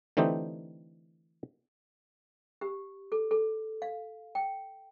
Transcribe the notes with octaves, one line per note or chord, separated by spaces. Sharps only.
D3 E3 A3 C4 D#4 G4
G4
A4
A4
F5
G5